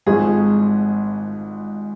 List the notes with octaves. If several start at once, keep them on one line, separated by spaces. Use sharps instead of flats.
G#1 G#2 F3 G#4